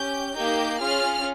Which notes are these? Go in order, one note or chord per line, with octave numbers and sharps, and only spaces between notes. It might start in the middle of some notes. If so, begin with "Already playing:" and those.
Already playing: C#4 G4 G6
A#3 D#4 G4 G6
C#4 F4 G#4 F6